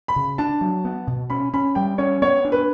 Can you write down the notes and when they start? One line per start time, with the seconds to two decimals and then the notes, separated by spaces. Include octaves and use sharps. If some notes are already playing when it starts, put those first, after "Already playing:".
0.08 B5
0.16 C#3
0.38 D4 A5
0.61 F#3
0.85 B3
1.07 B2
1.30 C#4 B5
1.54 C#4 B5
1.75 G3 G5
1.98 C#4 C#5
2.22 B3 C#5
2.45 D4
2.52 B4